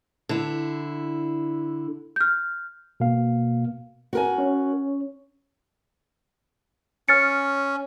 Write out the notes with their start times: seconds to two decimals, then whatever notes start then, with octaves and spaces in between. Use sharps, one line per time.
0.29 D3 E4
2.16 F6 G6
3.00 B2 A#3 F5
4.13 F#4 A#4 G#5
4.38 C#4 C#5
7.09 C#4 F6 A6 C#7